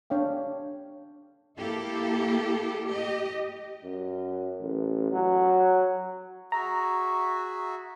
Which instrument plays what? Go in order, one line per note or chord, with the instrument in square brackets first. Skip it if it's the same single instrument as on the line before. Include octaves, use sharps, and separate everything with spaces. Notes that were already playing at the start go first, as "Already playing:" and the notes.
[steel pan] D4 C#5 F5 G5
[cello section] A#3 E4 G4 A4
G4 D#5
[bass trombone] F#2
A1
F#3
[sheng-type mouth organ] F#4 G#4 E5 [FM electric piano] A#5